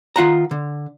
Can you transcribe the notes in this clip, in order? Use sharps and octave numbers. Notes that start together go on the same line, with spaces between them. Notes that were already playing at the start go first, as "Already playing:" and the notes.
D#3 F4 F#5 A#5
D3